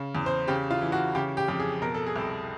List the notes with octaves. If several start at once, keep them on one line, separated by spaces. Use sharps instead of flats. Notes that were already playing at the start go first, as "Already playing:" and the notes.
Already playing: C#3
E2
C5
C#3 G4
F4
E3
F#4
C#3 G4
G4
F2 G4
G#4
B2 A#4
A4
G#4
C2 A4